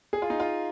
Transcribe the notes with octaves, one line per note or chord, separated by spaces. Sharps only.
G#4
F4
D#4
F4